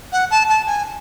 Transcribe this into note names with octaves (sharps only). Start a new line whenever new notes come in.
F#5
A5
A5
G#5